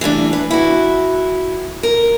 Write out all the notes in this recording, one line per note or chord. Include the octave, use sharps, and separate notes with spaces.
E3 G3 A3 D4
B4
E4 F#4
A#4